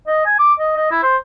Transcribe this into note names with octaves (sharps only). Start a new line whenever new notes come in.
D#5
G#5
D6
D#5
D#5
E4
C5